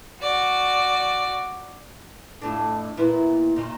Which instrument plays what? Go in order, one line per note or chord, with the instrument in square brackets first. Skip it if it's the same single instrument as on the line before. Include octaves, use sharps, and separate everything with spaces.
[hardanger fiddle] F#4 D5
[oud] F2 A2 D4
A#2 B3 E4
A#2 D#3